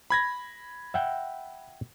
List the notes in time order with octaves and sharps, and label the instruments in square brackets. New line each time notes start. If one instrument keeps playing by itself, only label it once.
[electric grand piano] B5 G#6 A#6
[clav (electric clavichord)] E5 F#5 G5